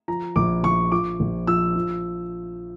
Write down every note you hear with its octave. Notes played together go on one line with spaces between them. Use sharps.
F3 A#5
A#1 D6
A#1 C#6
F3 D6
A#1
F3 E6
F3